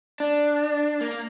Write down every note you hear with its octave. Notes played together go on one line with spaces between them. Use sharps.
D4
A#3